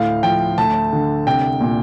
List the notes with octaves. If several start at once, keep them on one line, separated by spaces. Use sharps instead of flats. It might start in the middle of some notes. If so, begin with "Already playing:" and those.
Already playing: D2 A2 F5
F3 G5
D2 A5
D3
C2 G5
A#2